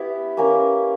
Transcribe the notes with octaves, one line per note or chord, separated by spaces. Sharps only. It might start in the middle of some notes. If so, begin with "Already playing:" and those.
Already playing: B3 E4 G4 E5
A#3 C#4 G4 A#4